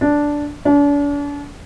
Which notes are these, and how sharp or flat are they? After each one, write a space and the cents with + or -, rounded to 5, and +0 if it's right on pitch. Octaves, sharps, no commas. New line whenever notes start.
D4 -5
D4 -40